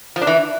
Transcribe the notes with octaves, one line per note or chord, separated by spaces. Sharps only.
F3
D4
E3